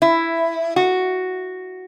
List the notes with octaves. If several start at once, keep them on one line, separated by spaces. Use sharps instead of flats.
E4
F#4